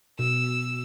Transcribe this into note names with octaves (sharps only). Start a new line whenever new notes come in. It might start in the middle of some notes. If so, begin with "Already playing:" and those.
B2 E6